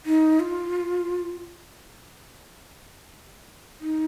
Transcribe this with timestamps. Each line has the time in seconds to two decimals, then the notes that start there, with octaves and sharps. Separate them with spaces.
0.06 D#4
0.40 F4
3.81 D#4